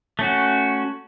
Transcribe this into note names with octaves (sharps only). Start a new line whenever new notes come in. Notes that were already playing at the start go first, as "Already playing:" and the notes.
A3 C#4 F#4